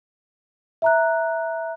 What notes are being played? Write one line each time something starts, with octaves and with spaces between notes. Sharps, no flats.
E5 A#5 F#6